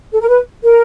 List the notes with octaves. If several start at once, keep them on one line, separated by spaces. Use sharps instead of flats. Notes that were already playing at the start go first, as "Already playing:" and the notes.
A4
A#4
B4
A#4